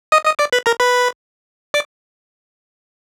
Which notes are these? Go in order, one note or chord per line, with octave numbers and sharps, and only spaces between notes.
D#5 D#6
D#5 D#6
D5 D6
B4 B5
A#4 A#5
B4 B5
D5 D6